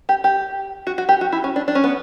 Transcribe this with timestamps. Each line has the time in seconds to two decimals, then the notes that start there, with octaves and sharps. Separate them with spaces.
0.09 G4
0.24 G4
0.87 F#4
0.98 F#4
1.09 G4
1.21 F#4
1.32 E4
1.44 C#4
1.56 D4
1.68 D4
1.75 C#4
1.84 B3